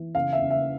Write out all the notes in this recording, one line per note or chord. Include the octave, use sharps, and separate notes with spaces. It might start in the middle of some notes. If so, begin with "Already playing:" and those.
Already playing: E3
C#3 F5
E5
C#3
E5